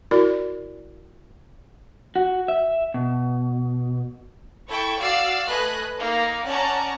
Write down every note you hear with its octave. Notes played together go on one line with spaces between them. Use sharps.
E4 F#4 A#4 D5
F#4
E5
B2
E4 A4 G5 C#6
F#4 D5 F5 E6 C7
A3 B4 D#5 G#5 F#6
A#3 D#4
C#4 D5 F#5 A5 A#5 C#6